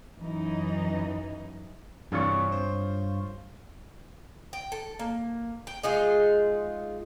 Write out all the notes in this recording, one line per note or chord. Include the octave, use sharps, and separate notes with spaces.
F#2 E3 D#4
G2 C3 E3 D4 F4 C#5
C5
G5
A4
A#3
G5
G#3 D#4 F4 G#4